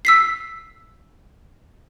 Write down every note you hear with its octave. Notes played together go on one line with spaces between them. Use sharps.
E6 B6 C7